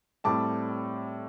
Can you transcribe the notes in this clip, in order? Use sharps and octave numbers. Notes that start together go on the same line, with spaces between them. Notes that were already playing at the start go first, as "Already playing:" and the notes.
A2 G3 C4 A5 D6